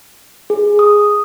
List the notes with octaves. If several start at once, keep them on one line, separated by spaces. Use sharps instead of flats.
G#4
D#6